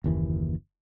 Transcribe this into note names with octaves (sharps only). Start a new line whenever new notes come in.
F#1 D#2 E3